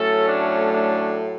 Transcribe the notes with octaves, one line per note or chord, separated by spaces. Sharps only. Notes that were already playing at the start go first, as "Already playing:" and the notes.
Already playing: A2 F#3 A3 C#4 A4
D4
D4